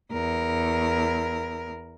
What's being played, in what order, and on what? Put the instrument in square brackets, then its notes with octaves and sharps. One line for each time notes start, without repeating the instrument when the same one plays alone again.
[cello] E2 A#4